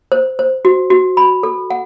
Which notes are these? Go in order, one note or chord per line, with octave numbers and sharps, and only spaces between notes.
C5
C5
F#4
F#4
B5
A4
F#5